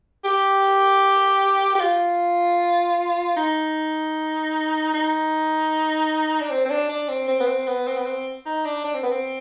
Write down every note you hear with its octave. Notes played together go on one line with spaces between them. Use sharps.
G4
G4
F4
D#4
D#4
D4
C4
C4
D4
D4
C4
C4
B3
C4
B3
C4
B3
C4
D#4
D4
D4
C4
B3
C4